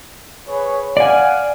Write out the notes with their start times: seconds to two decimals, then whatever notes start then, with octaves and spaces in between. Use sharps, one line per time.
0.48 G#4 B4 C#5
0.97 D5 F5 F#5 G#5